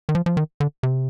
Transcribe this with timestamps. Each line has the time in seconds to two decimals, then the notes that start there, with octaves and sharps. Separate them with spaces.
0.09 D#3
0.15 F3
0.26 F3
0.37 D#3
0.60 D3
0.83 C3